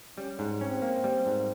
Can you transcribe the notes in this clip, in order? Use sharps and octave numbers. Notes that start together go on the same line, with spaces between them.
G3 C#4
G#2
C4 C#4
A#3
G3
G#2